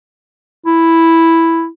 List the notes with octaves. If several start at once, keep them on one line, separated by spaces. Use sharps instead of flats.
E4